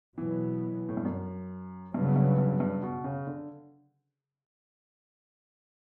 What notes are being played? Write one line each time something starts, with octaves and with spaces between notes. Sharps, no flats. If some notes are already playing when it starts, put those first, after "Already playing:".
B2 E3 F#3 B3
A2
G2
F#2
G2 C#3 F#3 B3
G2
G2
G2
B2
C#3
D3